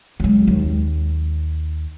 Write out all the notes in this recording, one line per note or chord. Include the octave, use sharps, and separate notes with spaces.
F#3 G#3
D#2